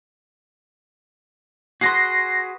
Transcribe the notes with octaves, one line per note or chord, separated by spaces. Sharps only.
F#4 G#4 B4 C6 A#6 C7